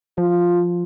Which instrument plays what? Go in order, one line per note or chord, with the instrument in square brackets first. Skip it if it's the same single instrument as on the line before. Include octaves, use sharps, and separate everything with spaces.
[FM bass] F3 [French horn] F4